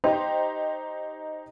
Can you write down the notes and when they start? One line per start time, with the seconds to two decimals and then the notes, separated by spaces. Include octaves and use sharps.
0.04 D#4 G4 C5